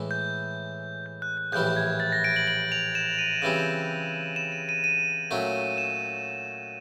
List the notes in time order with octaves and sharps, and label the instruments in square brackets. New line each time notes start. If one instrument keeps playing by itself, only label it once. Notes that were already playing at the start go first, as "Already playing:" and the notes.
Already playing: [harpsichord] A2 E3 G#3
[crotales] G6
G6
F#6
F#6
[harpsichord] A#1 A2 E3 G3 [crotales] G6
[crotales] G#6
A6
A#6
D7
F#7
F#7
F7
E7
D#7
[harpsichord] C#3 E3 G3 C4 [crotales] F7
[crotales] E7
D#7
D#7
D#7
[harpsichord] A#2 F#3 A3 C#4
[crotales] E7